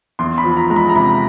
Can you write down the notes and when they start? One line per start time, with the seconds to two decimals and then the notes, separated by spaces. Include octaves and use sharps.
0.19 E2 C6
0.38 B5
0.44 F3
0.57 A#5
0.70 G#3 A#5
0.76 B5
0.89 A#5
0.95 C3 B5